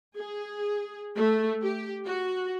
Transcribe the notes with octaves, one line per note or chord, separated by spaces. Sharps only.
G#4
A3
G4
F#4